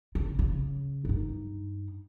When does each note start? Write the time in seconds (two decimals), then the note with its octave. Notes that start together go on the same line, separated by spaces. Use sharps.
0.15 C#3
0.39 C#3
1.05 G2 D#4